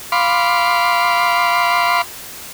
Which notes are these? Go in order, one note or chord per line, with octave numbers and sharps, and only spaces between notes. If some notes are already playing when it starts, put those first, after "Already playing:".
F5 B5 C6 D6